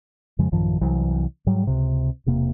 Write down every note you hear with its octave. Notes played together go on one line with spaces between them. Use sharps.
F2 C#3 F3 G#3
A1 F#2 D#3 F3
C2 E3 F#3
G#2 F#3 G3
C#2 C3
E1 C3 A#3